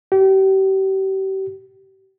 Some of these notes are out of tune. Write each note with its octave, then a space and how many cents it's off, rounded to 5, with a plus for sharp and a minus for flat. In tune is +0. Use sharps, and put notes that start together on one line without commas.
G4 -35